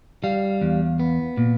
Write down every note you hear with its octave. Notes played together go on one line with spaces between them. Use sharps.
G3 F5
E2
B3
A#2